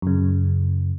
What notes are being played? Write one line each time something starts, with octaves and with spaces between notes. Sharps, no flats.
F#2 C#3